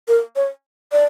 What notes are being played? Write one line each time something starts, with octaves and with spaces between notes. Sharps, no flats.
A#4
C#5
D5